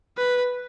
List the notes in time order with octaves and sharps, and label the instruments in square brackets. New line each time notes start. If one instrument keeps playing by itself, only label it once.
[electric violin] B4